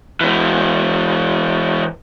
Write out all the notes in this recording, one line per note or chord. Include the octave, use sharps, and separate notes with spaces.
E3 G#3